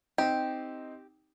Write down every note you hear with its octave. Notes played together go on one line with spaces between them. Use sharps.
C4 D#4 G4